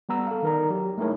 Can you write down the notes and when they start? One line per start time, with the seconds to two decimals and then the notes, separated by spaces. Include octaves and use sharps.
0.09 G3 B3 A#5 E6
0.27 A4 F5
0.43 D#3 D#4 A#4 D5 A#5
0.70 F#3 G4
0.98 G#3 A3 D#4 E4 A#4 C#5